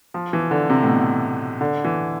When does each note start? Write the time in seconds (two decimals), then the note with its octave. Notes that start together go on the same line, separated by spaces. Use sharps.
0.14 F3
0.33 E3
0.51 D3
0.70 C3
0.83 A2
0.88 B2
1.61 D3
1.85 E3